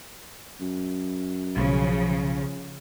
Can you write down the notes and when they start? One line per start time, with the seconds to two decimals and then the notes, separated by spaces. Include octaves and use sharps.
0.60 F#2
1.57 B1 C#3 F3